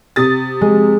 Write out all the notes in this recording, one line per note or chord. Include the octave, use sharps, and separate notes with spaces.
C3 D#6 A6
G#3